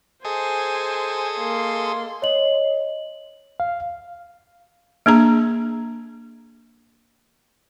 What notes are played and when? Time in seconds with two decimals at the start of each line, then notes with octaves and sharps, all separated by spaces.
0.25 G#4 A4 C5 D#5 G#5
1.38 A#3 C6
2.22 C#5 D#5 F#7
3.60 F5
5.06 A#3 D4 G#4 A#5